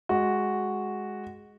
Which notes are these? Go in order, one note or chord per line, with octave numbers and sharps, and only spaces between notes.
G#3 F#4